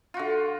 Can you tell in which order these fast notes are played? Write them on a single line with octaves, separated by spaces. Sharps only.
F4 F#4 D3